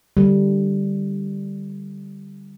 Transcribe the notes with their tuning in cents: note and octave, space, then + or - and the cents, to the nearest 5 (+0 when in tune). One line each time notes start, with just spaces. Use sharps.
D3 +10 G3 +0